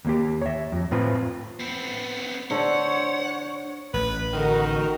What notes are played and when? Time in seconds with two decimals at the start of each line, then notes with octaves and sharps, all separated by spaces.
0.05 D#2 A#3 G4
0.42 C#5 E5
0.72 F2
0.91 A2 C4 F4 B4
1.60 B3 C4
2.51 D3 A3 C5 C#5 F#5
3.94 A1 B4
4.33 D3 D#3 D#4 F#4 A#4